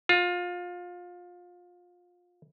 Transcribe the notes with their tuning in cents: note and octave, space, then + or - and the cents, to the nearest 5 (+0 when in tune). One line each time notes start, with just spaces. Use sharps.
F4 +25